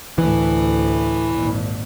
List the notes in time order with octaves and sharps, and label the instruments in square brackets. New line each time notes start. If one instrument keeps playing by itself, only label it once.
[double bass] D2 A2 [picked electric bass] E3
[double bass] G#1 A#2